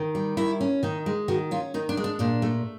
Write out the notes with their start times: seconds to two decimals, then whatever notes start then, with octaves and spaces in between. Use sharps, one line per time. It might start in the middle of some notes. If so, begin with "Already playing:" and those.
Already playing: D#3
0.15 G3
0.37 D#3 E4
0.61 C#4
0.83 D#3 D#4
1.06 G#3
1.28 D#3 F#4
1.51 C#4 F4
1.74 D#3 D#4
1.89 D4
1.97 G#3
2.04 D4
2.19 A#2 D4
2.42 A3